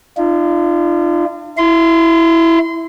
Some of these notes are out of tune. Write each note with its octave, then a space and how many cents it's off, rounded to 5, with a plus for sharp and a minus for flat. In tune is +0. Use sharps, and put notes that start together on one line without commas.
D4 +40 F4 -30
E4 +0 C6 -25